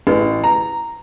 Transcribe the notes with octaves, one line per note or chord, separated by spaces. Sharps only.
A1
A#5